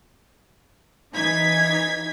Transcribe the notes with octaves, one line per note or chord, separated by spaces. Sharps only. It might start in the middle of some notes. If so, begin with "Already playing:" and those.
E3 D#4 G#6 B6